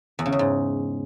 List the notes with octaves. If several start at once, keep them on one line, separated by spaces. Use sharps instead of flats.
E2
C#3
E2
G#2